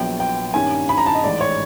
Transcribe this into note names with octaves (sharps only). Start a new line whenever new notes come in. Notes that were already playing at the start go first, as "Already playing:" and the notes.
Already playing: A#1 A#2 F#3 B3 G5
G5
G2 D#3 G3 A#3 C#4 G#5
B5
A#5
A5
D#5
A1 G#2 D#3 D5
C#5